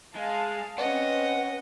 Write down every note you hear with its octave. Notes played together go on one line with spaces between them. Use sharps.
G#3 F5 G#5 A5
C4 C#4 B4 D#5 F#5